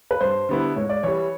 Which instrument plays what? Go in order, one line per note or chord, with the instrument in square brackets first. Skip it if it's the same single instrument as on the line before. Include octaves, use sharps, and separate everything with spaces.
[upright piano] B4
[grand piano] G2 [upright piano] C5
[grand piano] D3 G3 B3 E4
[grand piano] G#2 [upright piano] C#5
[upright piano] D5
[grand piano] E3 G3 [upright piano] C#5